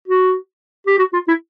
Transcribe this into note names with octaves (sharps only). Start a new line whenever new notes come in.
F#4
G4
F#4
F4
E4